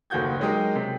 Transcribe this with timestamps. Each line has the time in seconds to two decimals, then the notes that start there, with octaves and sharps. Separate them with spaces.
0.10 F#1 D#2 A3 F#4 G6 G#6
0.40 F#3 G#3 D#4 G4 A#4
0.75 C3